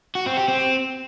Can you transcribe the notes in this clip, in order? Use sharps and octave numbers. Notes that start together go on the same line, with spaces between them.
F#4
C4
G4
C4